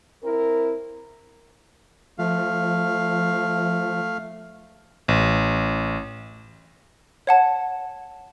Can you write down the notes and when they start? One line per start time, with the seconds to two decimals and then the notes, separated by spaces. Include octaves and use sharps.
0.23 C4 E4 A#4
2.19 F3 A3 F5
5.08 A1
7.27 C#5 F#5 A5